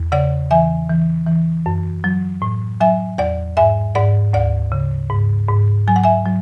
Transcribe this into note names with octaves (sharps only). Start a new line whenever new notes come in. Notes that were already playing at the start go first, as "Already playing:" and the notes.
Already playing: E2
C#3 D5 F#5
E3 E5 G#5
E3
E3
F#2
F#3
A2
F#3 E5 G#5
E2 D5 F#5
G#2 E5 G#5
G#2 D5 F#5
D2 D5 F#5
C#3
G#2
G#2
F#3 G#5
F#5
E5 G#5
F#3